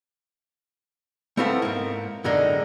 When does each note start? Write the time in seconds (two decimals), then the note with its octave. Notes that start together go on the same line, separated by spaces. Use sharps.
1.37 A3 B3 C4 E4 A4 F5
1.62 G#2 A#3
2.24 F#2 A2 D3 G#3 A#3 D#4